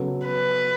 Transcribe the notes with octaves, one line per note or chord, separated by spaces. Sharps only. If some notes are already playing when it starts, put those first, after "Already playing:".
Already playing: C#3 F#3 B3 A4
B4